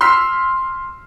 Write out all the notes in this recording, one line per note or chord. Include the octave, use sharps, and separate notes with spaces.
C6 E6 F6 B6 C7